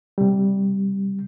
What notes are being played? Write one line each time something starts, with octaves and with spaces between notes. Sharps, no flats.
C3 G3